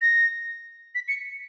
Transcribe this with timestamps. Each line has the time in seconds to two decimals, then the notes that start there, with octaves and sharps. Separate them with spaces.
0.02 A#6
0.95 B6
1.08 C#7